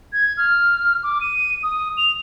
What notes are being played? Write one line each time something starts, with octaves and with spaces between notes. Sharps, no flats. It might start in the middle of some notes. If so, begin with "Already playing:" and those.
G#6
F6
D6
D#7
D#6
F7